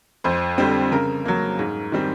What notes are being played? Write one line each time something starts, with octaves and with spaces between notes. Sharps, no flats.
F2 C5
D3 G3 C4
C#3 A#4
F#3 A#3
G#2
D#3 G3 C4